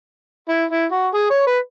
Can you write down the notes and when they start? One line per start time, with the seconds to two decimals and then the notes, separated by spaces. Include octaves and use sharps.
0.49 E4
0.70 E4
0.92 F#4
1.14 G#4
1.30 C#5
1.46 B4